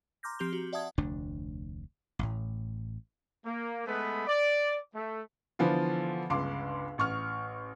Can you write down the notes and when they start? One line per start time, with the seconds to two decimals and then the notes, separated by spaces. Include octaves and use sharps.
0.23 A#5 C6 D6 F6 G6 A#6
0.39 F3 C4 G4 G6 F7 G7
0.53 F#4
0.73 D5 E5 F#5 A5 D#6 G#6
0.98 F1 D2 D4
2.19 A1 A2
3.45 A#3
3.86 G#3 A3 B3 B4
4.27 D5
4.94 A3
5.59 D3 E3 F3 B3 F4
6.30 G1 C#2 C6 D6
6.98 A1 C#6 F6